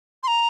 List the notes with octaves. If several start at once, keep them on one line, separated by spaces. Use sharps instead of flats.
C6
A#5